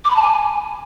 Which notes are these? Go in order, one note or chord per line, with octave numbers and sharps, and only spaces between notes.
D6
B5
A5
G#5